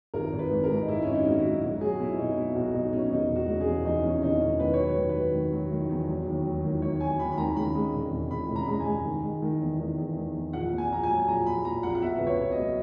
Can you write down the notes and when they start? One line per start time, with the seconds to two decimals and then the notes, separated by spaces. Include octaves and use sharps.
0.14 G#1 A#4
0.33 G#1
0.39 B4
0.51 G#2
0.63 A#4
0.70 G#2
0.82 D#4
0.88 G#2 E4
1.02 G#1 C#4
1.13 D#4
1.25 G#2 F#4
1.38 E4
1.44 F#3
1.62 B1 F#4
1.81 F#3 G#4
1.99 B2 E4
2.18 B2 D#4
2.36 F#3 E4
2.55 B1 F#4
2.74 B1 D#4
2.92 B2 C#4
3.11 E1 D#4
3.29 E1
3.36 F#4
3.48 C#3
3.61 G#4
3.67 E2
3.85 E2 D#4
4.04 E2 C#4
4.22 E1 D#4
4.41 E1 C#4
4.59 D#3 B4
4.74 F#3 C#5
4.84 B4
4.96 D#3
5.09 B4
5.15 F#3
5.34 D#3
5.53 F#3
5.71 D#3
5.90 E2
6.08 F#3
6.27 D#2
6.46 F#3
6.64 D#3
6.82 D#3 C#5
7.01 F#3 G#5
7.19 D#2 B5
7.32 B5
7.37 D#3 A#5
7.57 C#3 B5
7.75 G#3
7.94 E1
8.12 E1
8.31 E1 B5
8.49 C#3
8.56 A#5
8.63 B5
8.68 G#3 A#5
8.80 G#5
8.86 G#3
9.05 D#3
9.23 G#3
9.42 D#3
9.61 E2
9.79 D#3
9.98 E2
10.16 D#3
10.35 E2
10.53 A#1 F#5
10.72 A#2
10.78 G#5
10.91 A#1 A#5
11.03 G#5
11.09 F#3
11.19 G#5
11.28 A#1 A#5
11.46 A#1 B5
11.65 A#2 A#5
11.83 A#1 F#5
11.95 F#5
12.02 B2 E5
12.18 C#2 B4
12.27 C#5
12.39 B2
12.52 D#5
12.58 F#3